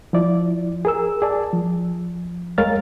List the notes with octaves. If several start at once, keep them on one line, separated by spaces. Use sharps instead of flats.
F3 E4 D5
G#4 A#4 E6
G#4 D5 A5
F3
G#3 A#4 C#5 F5 F6 A6